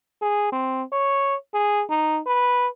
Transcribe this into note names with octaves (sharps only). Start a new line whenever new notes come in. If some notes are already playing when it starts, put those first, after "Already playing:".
G#4
C4
C#5
G#4
D#4
B4